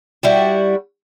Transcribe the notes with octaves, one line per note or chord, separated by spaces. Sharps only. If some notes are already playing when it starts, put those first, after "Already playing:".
G3 E4 F#4